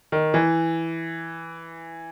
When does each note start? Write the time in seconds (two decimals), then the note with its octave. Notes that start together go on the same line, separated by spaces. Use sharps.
0.12 D#3
0.34 E3